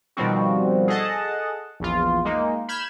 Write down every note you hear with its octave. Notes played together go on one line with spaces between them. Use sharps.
B2 D#3 F3 G3 C4 F#4
G#4 A4 D#5 F#5 A5
A#1 E2 F4
G#3 A#3 D#4
B5 F6 G6 G#6 E7